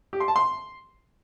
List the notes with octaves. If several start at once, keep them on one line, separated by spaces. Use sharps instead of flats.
G4
C6
A5
C6